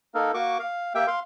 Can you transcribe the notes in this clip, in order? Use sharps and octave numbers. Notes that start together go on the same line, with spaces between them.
A#3 D#4 A4 A#4
A#3 F#4 C#6 D6
F5
A#3 G4 E5 G5
F5 C6